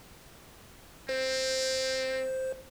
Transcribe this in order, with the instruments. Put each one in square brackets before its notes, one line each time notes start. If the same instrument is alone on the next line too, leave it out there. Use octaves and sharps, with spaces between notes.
[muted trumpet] C4 [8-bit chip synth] C5